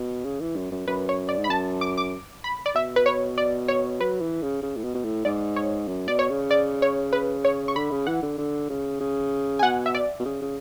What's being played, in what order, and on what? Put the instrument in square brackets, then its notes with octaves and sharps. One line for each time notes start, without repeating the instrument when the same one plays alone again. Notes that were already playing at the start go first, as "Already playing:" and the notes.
Already playing: [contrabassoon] B2
C#3
E3
F#2
F#2
[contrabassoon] F#2 [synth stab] B4
[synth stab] C#5
D5
[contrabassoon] G#2
[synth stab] B5
[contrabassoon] F#2 [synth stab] A5
[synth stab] D6
D6
B5
D5
[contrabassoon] B2 [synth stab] E5
[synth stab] B4
C#5
D5
C#5
[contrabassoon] F#3 [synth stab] B4
[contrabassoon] E3
C#3
C#3
A2
B2
B2
A2
[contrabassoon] G#2 [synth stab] D5
[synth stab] C#5
[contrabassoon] F#2
[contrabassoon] B2 [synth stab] D5
[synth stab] C#5
[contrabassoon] C#3
[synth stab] D5
C#5
B4
C#5
C#6
[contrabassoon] D3 [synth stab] B5
[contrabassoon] C#3
[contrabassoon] E3 [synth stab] F#5
[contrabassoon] D3
D3
C#3
C#3
[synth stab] G#5
[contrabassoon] B2 [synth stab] F#5
[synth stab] E5
D5
[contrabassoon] B2
C#3
C#3